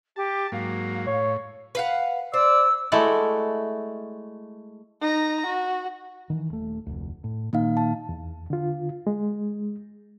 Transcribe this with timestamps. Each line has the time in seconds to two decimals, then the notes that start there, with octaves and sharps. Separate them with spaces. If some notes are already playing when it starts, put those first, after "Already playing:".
0.16 G4 A5
0.52 G#2 F#3 A#3 F5
1.07 A2 C#5
1.75 B4 F5 F#5
2.34 C5 D5 E6
2.92 G#3 A3 E4 F#4 D5
5.01 D#4 A#5
5.46 F#4
6.30 D#3 E3
6.50 D#1 A3
6.87 F1 D2
7.24 A2
7.53 A#2 D#3 A#3 D#4 F5
7.77 A5
8.09 E2
8.50 D3 F4
9.07 G#3